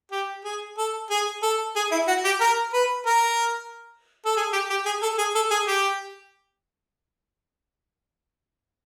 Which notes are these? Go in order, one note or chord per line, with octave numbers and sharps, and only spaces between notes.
G4
G#4
A4
G#4
A4
G#4
E4
F#4
G4
A#4
B4
A#4
A4
G#4
G4
G4
G#4
A4
G#4
A4
G#4
G4